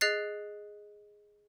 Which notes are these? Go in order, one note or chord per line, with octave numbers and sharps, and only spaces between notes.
G#4 D#5 F#6 A6 C7